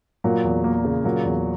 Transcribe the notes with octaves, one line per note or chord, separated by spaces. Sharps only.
A#2 F#3
E2
A#3
C#3
A#2 F#3
E2